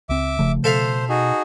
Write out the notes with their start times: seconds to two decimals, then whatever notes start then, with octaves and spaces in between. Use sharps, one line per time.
0.09 C#2 C4 E5 D6
0.39 E1 C#3 F3 A3
0.64 B2 A4 C5 E5 F5
1.09 D#4 F#4 G#4